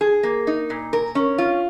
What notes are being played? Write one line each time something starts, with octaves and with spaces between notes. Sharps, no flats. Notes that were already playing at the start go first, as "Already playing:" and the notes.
G#4
A#3
D#4
A#2
A#4
C#4
F4